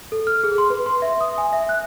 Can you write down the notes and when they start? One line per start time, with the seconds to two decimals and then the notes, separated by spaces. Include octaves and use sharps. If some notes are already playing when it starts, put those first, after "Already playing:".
0.12 A4
0.27 F6
0.44 G#4
0.58 C6
0.70 B4
0.86 C6
1.02 E5
1.21 D#6
1.38 G#5
1.53 E5
1.69 F#6